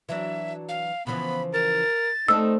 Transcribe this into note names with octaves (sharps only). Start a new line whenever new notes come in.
E3 F#3 D4 E5
F5
C#3 E3 F3 B3 B5
A#4 A6
A3 C4 D4 D#4 E6